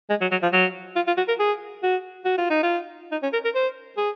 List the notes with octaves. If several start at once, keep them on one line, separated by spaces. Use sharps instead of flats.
G#3
F#3
F#3
F3
F#3
F4
F4
F#4
A#4
G#4
F#4
F#4
F4
D#4
F4
D#4
C#4
A#4
A#4
C5
G#4